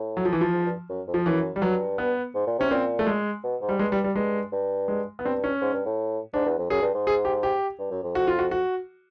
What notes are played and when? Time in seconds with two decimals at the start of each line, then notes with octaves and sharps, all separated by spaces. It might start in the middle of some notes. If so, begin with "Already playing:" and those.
Already playing: A2
0.17 F#3
0.25 F3
0.33 E3
0.41 F3
0.53 G#2
0.66 G2
0.89 F#2
1.07 F2
1.14 F3
1.26 F#2 E3
1.56 G3
1.62 G2 F#3
1.98 B3
2.35 G#2
2.47 A#2
2.59 C3 C#4
2.71 A#2 C4
2.99 A3
3.07 G#3
3.44 B2
3.62 G#2
3.69 G3
3.79 G2 G#3
3.92 G3
4.04 G3
4.15 G2 G#3
4.52 G2
4.88 G#3
5.19 B3
5.25 G2 C4
5.44 C#4
5.62 G#2
5.73 G2
5.86 A2
6.34 G#2 D4
6.45 E2
6.58 F2
6.70 F#2 G#4
6.82 G2
6.95 G#2
7.07 G#4
7.25 G4
7.43 G4
7.79 G2
7.91 F#2
8.03 F2
8.15 F#4
8.27 F4
8.39 F#4
8.51 F#4